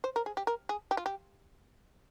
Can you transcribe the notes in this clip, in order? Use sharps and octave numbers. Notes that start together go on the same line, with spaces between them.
C5
A#4
G#4
G4
A#4
G#4
G4
F4
G4